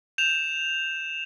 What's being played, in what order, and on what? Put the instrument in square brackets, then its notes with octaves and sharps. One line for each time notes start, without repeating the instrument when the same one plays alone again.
[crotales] G6 E7 F7